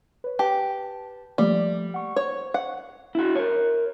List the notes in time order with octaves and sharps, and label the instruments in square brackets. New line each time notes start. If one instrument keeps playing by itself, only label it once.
[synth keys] B4 C#5
[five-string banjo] G4 [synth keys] B4 A5
[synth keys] F3 A3 A#3 [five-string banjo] G3
[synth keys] F#5 C#6
[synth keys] C5 C#6 [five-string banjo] C#5
[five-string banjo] F#5
[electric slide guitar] E4 F#4
A#4 C#5